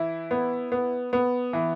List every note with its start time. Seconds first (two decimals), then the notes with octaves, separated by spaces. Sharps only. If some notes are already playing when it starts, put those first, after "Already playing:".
Already playing: E3 E4
0.31 B3
0.72 B3
1.13 B3
1.53 E3